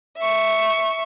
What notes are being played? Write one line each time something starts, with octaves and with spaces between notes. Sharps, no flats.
E5 C#6